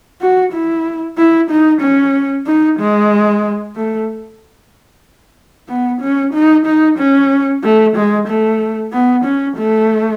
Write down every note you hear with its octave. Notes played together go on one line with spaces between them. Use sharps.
F#4
E4
E4
D#4
C#4
D#4
G#3
A3
B3
C#4
D#4
D#4
C#4
A3
G#3
A3
B3
C#4
A3